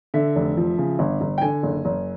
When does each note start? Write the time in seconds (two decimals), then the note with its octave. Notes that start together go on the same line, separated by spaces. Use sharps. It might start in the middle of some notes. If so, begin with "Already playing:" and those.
0.14 D3 E5
0.36 F1
0.57 F3
0.78 C#3
0.99 G1
1.21 G1
1.38 G5
1.41 D3 G#5
1.63 F#1
1.85 F#1